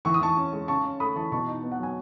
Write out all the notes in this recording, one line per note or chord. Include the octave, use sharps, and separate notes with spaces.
E3 C#6
D#6
E3 A5 C#6
C#4
G#3
C#3 A5 C#6
C#4
A3 B5 D#6
E3 A5 C#6
B2 A5 C#6
D#4
B3
F#5
F#3 G#5